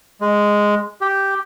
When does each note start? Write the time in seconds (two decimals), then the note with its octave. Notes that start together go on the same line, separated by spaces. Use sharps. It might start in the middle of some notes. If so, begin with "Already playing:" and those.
0.21 G#3
1.01 G4